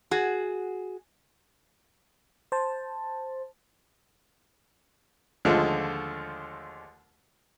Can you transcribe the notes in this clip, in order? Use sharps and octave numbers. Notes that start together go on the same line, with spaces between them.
F#4 G#4
C5 A5
D#2 D3 F3 G#3 A3